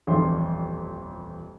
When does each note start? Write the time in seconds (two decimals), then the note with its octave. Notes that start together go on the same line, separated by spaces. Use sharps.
0.07 D#1 A1 F2 F4 C6